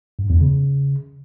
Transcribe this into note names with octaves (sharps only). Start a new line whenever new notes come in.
G2
E2
C#3